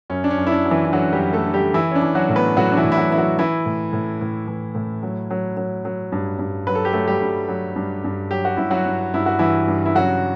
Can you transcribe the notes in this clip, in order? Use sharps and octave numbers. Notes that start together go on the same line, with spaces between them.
F#2 C#4
D4
C#4
F#2
E4
D4
F#3
E3 E4
E4
D3 F#3 F#4
G3 G4
F#2
A3 A4
D3
G3 G4
E3 E4
C#4
D4
E3
F#3 F#4
A2
B3 B4
A2 F#3 F#4
D4
E3 E4
A2
E4
F#3 F#4
E3 E4
F#3 F#4
E3 E4
A2
A2
A2
E3
A2
F#3
F#3
F#3
F#3
G2
G2
F#3 B4
A4
G4
F#3 A3 A4
G3 G4
G2
F#3
G2
G2
F#3 G4
F#4
G2 E4
F#3 F#4
G2
G2 E4
F#4
G2 E3 E4
G2
E4
C#3 F#3 F#4